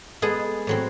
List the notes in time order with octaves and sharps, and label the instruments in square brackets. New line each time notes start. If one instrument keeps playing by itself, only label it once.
[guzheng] G#3 B3 G#4 A4
A2 F#3 C4